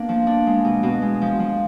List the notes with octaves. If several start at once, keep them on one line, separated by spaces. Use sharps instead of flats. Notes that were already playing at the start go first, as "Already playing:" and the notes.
Already playing: A#3 B3 D4
F3
D4
G#3
B2
B2
G#3
F3
F3